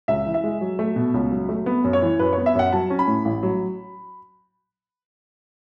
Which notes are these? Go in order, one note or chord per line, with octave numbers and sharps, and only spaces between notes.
C#2 E5
E3
E5
G#3
F#3
A3
B2
C#2
F#3
A3
B3
F#2
C#5
E3
F#2 B4
B3 C#5
E5
F#2 F#5
F#3 A5
C#4
B5
A2
A1
F#3